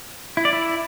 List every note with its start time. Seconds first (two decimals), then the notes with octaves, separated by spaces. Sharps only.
0.37 E4
0.45 D5
0.53 E4